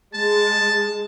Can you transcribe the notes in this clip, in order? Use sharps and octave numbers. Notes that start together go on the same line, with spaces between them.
G#3 A5